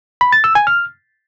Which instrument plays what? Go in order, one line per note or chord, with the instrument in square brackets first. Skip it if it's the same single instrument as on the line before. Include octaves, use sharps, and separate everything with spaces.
[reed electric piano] B5
A6
E6
G#5
F6